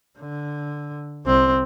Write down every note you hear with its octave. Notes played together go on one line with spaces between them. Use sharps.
D3
C2 C4